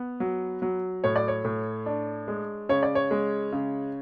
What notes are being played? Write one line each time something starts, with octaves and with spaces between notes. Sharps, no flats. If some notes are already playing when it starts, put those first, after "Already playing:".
Already playing: B3
F#3
F#3
A2 C#5
D5
C#5
A2
D4
G#3
C#3 C#5
D5
C#5
G#3
C#3